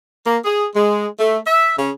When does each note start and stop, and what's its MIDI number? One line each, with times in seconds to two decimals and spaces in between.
0.24 0.37 58
0.44 0.64 68
0.74 1.05 56
1.19 1.36 57
1.45 1.71 76
1.77 1.89 49